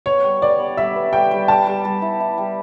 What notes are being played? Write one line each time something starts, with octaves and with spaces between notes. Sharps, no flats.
B3 C#5
G3
B3 D5
B3
G3 E5
B3
G3 G5
G3
G3 A5
G3
G3
E4
E4
G3